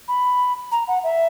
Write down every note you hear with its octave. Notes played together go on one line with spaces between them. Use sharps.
B5
A#5
F#5
E5